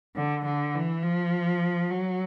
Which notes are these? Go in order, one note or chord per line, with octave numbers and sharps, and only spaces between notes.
D3
D3
E3
F3
F#3